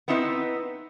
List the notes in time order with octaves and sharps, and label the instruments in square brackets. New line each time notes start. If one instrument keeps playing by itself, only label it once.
[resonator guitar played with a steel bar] B3 C4 D#4 E4 A4 B4